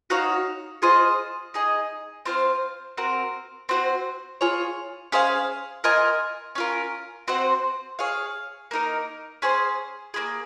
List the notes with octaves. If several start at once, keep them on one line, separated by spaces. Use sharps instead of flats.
D#4 F#4 C#5 F5
F4 G#4 C5 D#5
D#4 G#4 D#5
C4 F4 C5 F5
C4 F#4 A#4
C4 F#4 C5
F4 G#4 C#5
C#4 G#4 C5 F5
F4 A#4 D#5 G#5
C#4 F4 A#4
C4 F#4 C5 F#5
G#4 C#5 F5
A#3 D#4 A#4
C#4 G#4 C5
A#3 C#4 G#4